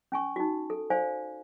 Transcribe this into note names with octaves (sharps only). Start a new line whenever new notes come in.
C#4 G#5 C#6
D#4 F#4
A4
C5 D5 F5 G#5